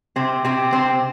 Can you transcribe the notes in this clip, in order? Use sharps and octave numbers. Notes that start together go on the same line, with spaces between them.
C3 C4
C3 C4
C3 C4